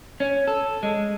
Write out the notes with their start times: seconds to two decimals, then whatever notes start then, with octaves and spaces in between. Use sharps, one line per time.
0.20 C#4
0.48 A4
0.83 G#3